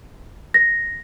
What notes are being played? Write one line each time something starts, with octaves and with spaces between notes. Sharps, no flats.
A#6